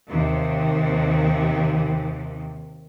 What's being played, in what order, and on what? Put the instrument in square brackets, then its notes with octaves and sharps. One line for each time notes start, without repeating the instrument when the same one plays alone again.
[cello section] D#2 C3